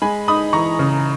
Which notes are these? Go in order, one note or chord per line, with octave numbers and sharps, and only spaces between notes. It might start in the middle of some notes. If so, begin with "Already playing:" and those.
G#3 G#5 B5
D#4 B5 D#6
E3 A#5 C#6
C#3